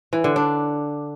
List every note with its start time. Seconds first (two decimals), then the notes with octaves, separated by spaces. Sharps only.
0.13 E3
0.24 D3
0.36 D4